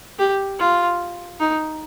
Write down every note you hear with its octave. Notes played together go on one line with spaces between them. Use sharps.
G4
F4
D#4